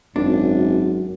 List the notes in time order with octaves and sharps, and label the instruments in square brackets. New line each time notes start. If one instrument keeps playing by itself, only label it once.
[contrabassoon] G#1 [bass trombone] F#2 [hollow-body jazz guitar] D4